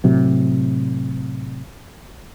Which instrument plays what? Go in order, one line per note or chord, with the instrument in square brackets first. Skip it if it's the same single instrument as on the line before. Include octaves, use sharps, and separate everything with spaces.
[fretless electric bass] A2 C3 F#3